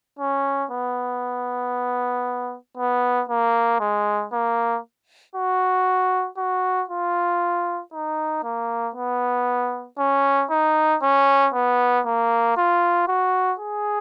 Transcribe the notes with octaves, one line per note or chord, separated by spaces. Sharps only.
C#4
B3
B3
A#3
G#3
A#3
F#4
F#4
F4
D#4
A#3
B3
C#4
D#4
C#4
B3
A#3
F4
F#4
G#4